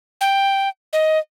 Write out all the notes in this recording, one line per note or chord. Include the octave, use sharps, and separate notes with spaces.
G5
D#5